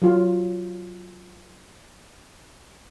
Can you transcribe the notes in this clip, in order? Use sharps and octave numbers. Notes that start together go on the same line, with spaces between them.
F#3 F4